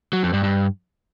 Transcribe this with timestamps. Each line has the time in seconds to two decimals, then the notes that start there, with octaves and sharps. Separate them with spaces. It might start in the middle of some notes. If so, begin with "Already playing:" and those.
0.13 F#3
0.23 F2
0.33 G2
0.43 G2